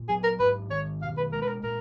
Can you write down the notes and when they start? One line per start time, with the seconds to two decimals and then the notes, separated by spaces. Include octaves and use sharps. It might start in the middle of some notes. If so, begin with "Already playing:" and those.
Already playing: A#2
0.09 F#3 G#4
0.24 A#4
0.39 G#2 B4
0.70 D#3 C#5
1.02 B2 F5
1.17 B4
1.32 G#3 A#4
1.42 B4
1.48 A#4
1.63 A#2 A#4